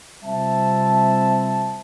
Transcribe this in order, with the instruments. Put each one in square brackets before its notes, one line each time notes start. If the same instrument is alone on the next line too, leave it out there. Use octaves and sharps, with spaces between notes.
[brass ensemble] C3 G3 C4 F4 E5 A5